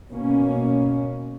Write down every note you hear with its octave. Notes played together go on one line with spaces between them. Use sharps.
B2 A#3 C#4